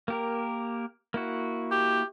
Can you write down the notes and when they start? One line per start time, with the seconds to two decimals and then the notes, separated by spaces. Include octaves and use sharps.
0.08 A#3 G4 A#4
1.14 A#3 E4 F#4
1.72 G4